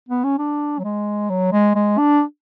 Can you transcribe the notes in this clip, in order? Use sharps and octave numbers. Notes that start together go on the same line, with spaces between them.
B3
C#4
D4
F#3
G#3
F#3
G#3
G#3
D4